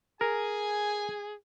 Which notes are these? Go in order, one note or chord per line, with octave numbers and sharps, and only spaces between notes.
G#4 A#4 G#5